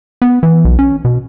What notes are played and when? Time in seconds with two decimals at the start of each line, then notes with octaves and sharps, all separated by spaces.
0.22 B3
0.43 E3
0.65 B1
0.79 C#4
1.05 B2